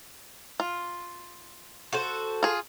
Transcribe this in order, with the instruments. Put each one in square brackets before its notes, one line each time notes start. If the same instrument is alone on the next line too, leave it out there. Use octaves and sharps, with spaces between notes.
[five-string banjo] F4
[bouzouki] F#4 A4 C5
[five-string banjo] F4 G#4